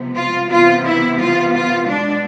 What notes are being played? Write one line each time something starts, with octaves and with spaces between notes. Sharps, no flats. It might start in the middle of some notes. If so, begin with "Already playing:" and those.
Already playing: C3 F3 G#3 B3
F4
C3 E3 B3 F4
E4
F4
F4
B2 G#3 B3 D4